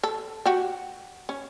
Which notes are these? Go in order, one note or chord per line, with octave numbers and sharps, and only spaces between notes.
A4
F#4 G4
C#4